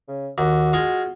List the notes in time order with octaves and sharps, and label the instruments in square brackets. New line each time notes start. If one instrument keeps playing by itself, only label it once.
[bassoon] C#3
[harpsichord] D#2 [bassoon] F#4
[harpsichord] G#3 F4